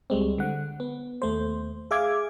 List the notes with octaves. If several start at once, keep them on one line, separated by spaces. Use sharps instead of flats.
C#2 G3 G#3 C4
D3 F#5
B3
D#2 A3 C5
G#4 E5 F5 D6 G#6